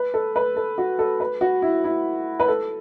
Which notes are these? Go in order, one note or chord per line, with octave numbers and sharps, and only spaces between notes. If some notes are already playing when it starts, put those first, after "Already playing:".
Already playing: B4
A4
B4
A4
F#4
A4
B4
F#4
E4
E4
B4
A4